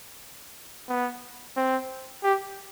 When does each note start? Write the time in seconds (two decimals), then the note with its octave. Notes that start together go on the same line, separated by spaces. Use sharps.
0.89 B3
1.57 C4
2.24 G4